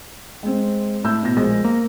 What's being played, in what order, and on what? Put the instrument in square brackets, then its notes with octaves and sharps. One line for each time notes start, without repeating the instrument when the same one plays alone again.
[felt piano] G#3 C4
[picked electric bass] A2 [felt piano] E5 E6 G6
[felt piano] B2 A#6
[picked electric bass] A#1 G#3 [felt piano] C5 A#6
[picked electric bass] A#3